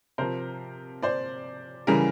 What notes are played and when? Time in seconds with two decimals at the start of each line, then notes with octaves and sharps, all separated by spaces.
0.18 C3 F3 A#4 C5
1.02 C5 D5
1.87 C#3 E3 G3 G#4 A#4